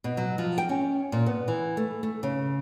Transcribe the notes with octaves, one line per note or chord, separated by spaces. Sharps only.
B2
F#3
F3
G5
C#4
A#2
B3
E3
A3
A3
C#3